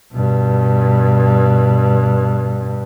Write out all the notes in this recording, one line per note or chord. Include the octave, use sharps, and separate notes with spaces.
G2 B2